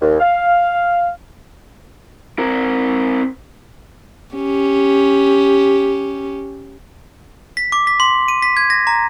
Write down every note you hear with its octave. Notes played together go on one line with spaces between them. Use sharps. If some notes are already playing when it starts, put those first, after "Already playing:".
D#2
F5
C4 A#4
C#4 G4
B6
D6
B6
C6
D#7
B6
G#6
A#6
A#5